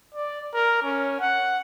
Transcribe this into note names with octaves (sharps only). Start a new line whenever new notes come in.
D5
A#4
C#4
F#5